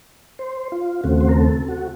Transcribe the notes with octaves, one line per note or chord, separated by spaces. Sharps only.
C5
F4
D#2 C#3 A3 C4 F#4
C5
A#4
A4
F#4